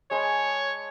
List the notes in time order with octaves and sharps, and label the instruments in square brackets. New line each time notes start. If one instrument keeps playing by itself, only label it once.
[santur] G#3 B4 A5 [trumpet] C#5